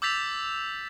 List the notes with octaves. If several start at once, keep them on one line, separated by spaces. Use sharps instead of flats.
D6 E6 G6 A6 B6 F7